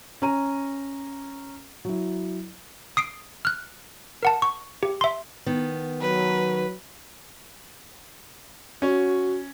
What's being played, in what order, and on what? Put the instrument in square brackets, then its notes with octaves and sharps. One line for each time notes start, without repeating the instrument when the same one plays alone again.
[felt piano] C#4 A#5 D#7
F#3 E4
[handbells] D#6 C7 D7
F6 F#6
A#4 F#5 A5
C#6
G4
E5 C6
[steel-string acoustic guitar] D#3 B3
[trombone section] F#3 [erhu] B4
[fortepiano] C#4 C#5 [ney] F#4